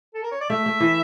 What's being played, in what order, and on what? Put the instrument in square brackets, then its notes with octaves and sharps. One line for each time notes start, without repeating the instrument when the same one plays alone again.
[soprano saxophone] A4
A#4
C#5
D5
[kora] A3 [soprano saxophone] E5
[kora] A3
E3